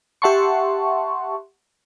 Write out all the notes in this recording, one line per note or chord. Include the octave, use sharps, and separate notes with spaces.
G4 E5 F#5 A5 C6 C#6